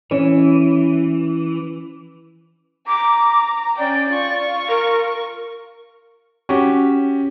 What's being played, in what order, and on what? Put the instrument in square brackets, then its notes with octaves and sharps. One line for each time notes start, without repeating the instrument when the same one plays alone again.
[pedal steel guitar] E3 [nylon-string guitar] C#4 C#5
[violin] A#5 [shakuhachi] D6
[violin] C#4 G5 [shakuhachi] D5
[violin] F4 C#6
[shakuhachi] A#4
[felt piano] C#4 F#4 G4